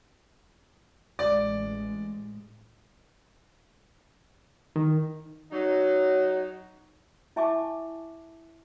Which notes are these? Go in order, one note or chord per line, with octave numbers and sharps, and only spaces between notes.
A1 G#3 D5
D#3
F#3 D#4
E4 E5 G#5 A5 C#6 D6